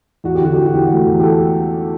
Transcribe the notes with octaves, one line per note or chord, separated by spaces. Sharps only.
E2 F#4
G4
D3 F#4
E2 G4
F#4
E2 G4
F#4
A3
E2
G4
A4